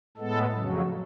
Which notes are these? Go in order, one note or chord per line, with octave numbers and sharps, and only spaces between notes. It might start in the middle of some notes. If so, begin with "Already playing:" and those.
A2 G#3 B3 A4
F2 C#3 F#3